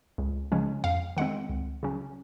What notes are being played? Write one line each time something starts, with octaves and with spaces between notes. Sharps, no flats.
C#2
C#3 F3 G#3 C#4
F2 F5
D#3 G#3 C4 F#5
C#2
C#3 F#3 C#4